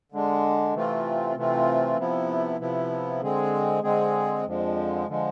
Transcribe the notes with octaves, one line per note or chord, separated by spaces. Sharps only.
D3 G#3 D4
C3 E3 A3 C4 F4
C3 E3 A3 C4 F4
C3 F3 B3 E4
C3 F3 B3 E4
D3 G#3 C4 G#4
D3 G#3 C4 G#4
F2 D3 F3 G#3
D3 F3 G#3